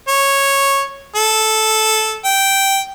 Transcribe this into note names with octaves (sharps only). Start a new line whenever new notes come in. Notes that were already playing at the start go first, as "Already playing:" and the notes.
C#5
A4
G5